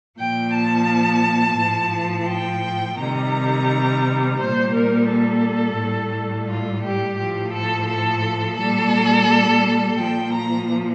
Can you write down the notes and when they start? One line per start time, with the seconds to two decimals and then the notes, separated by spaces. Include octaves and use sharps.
0.19 A#2 F3 G5
0.54 A5
1.59 A2 F3
2.29 G5
2.99 C3 D#3 G3 A#5
4.38 A#2 G3 C5
4.74 A#4
5.09 A4
5.78 A2 G3
6.49 F4
6.83 G4
7.18 A2 F3 G4
7.54 A4
7.88 A4
8.58 A#2 G3 A4
9.98 A#2 F3 G5
10.33 A#5